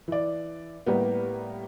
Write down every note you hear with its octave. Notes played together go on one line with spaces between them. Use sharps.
E3 D5
A2 G3 A#3 B3